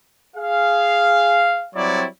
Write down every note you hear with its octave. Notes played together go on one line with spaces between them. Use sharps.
G#4 F5
F#3 G3 C4 E4 C#5 D5